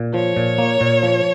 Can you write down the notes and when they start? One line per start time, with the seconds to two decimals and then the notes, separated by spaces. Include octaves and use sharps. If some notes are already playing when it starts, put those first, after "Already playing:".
Already playing: A#2
0.14 F3 C#5
0.37 A#2
0.58 A#3
0.81 A#2
1.03 F3